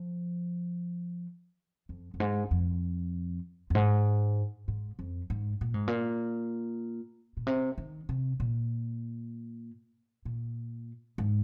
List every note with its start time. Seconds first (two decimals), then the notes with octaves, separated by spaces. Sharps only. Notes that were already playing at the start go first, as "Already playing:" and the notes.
Already playing: F3
1.89 F2
2.14 F2
2.20 G#2
2.51 F2
3.70 F2
3.75 G#2
4.68 G#2
4.99 F2
5.30 G#2
5.61 A#2
5.74 G#2
5.88 A#2
7.37 A#2
7.47 C3
7.78 D#3
8.09 C3
8.40 A#2
10.25 A#2
11.18 G#2